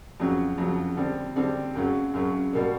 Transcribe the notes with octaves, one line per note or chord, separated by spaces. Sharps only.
F2 C#3 F#3
F2 C#3 F#3
D3 G3 C4
D3 G3 C4
F#2 C#3 F#3
F#2 C#3 F#3
B2 G3 A#3